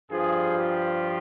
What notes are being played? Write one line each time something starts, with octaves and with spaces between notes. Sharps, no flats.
G2 F3 G#4
G4